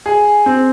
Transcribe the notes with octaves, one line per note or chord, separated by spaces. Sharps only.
G#4
C4